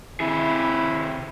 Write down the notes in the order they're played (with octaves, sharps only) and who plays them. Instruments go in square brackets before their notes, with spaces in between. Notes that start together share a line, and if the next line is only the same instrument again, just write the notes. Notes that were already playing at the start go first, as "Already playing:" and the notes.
[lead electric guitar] C3 G#4 [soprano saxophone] E4